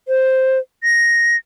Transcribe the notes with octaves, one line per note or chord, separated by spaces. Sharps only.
C5
A#6